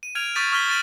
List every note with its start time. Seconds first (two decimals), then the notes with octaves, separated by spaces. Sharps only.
0.03 D#7
0.15 F6 G#6 D7 F7
0.35 C#6 D#6 G6 A6 B6 D#7
0.52 C#6 D#6 F6 G6 B6 G7
0.68 A6 D7 D#7 F#7